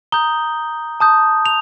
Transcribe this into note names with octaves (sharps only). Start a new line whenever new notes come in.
A#5 D#6 G6 G7
A5 D#6 G6
F7